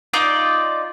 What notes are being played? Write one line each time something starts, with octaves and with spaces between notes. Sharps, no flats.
D#4 F4 D5 D6